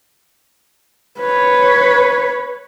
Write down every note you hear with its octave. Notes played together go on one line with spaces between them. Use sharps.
B4 C#5